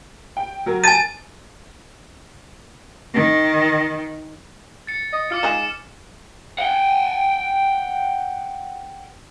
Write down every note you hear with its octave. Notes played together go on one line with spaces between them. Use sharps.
G5
F#3 A#4
G#5 A5 A6 D#7
D#3
A6 C#7
D#5
F4 D6 F6 C#7
G#3 D#4 G#4 E7
F#5 G5